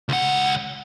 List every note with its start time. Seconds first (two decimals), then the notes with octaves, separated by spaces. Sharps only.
0.09 C#2 F#5